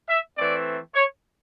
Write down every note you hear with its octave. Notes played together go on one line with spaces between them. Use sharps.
E5
E3 A3 C4 D5
C#5